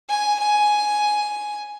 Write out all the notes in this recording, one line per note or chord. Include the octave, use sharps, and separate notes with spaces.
G#5
G#5